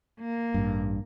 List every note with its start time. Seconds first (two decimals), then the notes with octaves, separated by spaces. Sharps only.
0.20 A#3
0.54 A1 G2